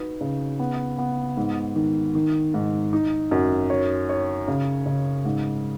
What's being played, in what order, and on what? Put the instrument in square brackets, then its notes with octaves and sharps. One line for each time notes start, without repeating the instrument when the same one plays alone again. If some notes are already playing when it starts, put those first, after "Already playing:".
Already playing: [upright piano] D#4 F#4 B4
C#3
B3
B3
G#2
D#3
D#3
G#2
D#4
F#2
C#5
C#5
C#3
C#3
G#2